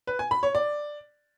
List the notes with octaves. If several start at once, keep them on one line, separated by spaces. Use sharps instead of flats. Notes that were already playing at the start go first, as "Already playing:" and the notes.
B4
G#5
B5
C#5
D5